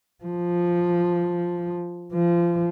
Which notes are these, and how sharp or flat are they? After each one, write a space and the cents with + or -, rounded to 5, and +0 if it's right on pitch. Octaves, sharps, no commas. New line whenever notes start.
F3 +0
F3 -25